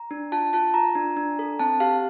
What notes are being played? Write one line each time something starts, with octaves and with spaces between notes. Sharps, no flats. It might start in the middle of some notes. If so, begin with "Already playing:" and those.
Already playing: A#5
D4
F4 A5
F4 A5
F4 A#5
D4
D4
A4
C4 A5
G4 F5